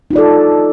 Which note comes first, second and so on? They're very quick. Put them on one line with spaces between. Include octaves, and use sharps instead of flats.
D#4 F4 D5 A4